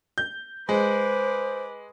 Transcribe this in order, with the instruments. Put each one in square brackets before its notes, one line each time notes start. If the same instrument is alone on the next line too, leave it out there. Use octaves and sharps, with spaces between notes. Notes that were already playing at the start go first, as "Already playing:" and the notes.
[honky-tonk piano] G6
[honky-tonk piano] G#3 [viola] B4 D6 [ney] C5